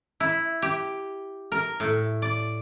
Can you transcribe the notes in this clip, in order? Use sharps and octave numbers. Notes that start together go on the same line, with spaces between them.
E4
G4
A#4
A2
D5